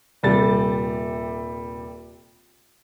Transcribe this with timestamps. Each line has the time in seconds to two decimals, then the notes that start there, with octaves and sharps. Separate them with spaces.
0.23 D#1 C3 G3 A4 A6